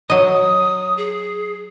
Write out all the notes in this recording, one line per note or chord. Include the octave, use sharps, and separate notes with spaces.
F#3 D#5 D#6
G#4